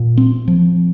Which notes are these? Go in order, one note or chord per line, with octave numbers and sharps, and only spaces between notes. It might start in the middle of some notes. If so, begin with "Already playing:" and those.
Already playing: A#2
C4
F3